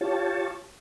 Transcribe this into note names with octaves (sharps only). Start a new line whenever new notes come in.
F4 G4 C#5 A5